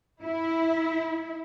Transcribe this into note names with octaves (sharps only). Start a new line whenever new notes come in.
E4